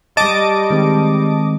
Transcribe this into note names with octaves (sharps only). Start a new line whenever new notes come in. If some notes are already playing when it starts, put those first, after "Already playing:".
G3 D#5 A5 D6
D#3 G#3 C4